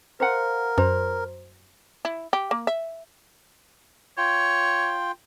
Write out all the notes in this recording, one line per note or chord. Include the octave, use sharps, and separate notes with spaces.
A#4 C5 F5 F#5
F#2 C5 A#5
E4
G4
A#3
E5
F4 C#5 G5